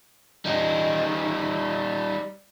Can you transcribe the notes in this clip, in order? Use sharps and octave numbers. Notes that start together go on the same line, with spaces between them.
G3 D#4